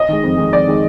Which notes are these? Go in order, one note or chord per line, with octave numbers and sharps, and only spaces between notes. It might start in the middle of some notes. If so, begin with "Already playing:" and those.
Already playing: D#5
D#3 G#3
F2
D#3 G#3
F2 D5
D#3 G#3